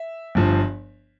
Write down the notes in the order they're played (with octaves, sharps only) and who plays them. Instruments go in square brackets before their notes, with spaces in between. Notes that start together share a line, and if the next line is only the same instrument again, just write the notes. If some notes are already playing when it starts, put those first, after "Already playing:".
Already playing: [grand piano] E5
G1 G2 F3